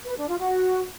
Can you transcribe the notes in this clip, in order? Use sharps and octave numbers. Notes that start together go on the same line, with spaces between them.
B4
D4
F4
F#4